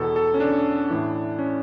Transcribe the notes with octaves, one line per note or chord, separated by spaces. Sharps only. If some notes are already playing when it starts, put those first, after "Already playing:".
Already playing: E2 B2 A4
A4
C#4
D4
A2 E3
C#4